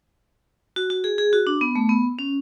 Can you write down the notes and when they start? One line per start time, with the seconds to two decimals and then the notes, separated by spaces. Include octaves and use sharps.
0.76 F#4
0.90 F#4
1.04 G#4
1.18 G#4
1.33 F#4
1.47 D4
1.61 B3
1.75 A3
1.89 B3
2.19 C#4